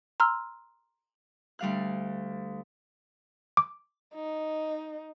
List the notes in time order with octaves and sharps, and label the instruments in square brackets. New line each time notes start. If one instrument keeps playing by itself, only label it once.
[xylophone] A#5 C6 E6 F6
[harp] D2 G3 F5 F#6
[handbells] D6
[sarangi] D#4